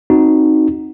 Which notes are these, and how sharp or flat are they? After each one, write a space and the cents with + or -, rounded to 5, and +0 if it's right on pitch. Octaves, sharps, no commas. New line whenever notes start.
C4 +15 D#4 +0 F#4 +0